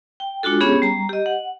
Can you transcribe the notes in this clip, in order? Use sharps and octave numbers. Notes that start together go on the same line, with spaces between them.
G5
G#3 D4 F4 F#4 A4
B3 C#4 G4 G#4 C#5
G3 A#5
G4 D#5
F#5